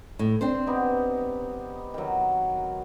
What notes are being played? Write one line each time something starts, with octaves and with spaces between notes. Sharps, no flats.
A2
C4 D4 C5
B3 D#4 G4
D#3 F#3